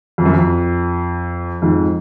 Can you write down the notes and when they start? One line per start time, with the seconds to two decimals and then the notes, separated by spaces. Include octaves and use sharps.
0.18 F2
0.25 F#2
0.33 F2
1.62 F2 G#2